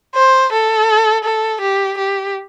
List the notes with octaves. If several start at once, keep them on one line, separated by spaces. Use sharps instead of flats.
C5
A4
A4
G4
G4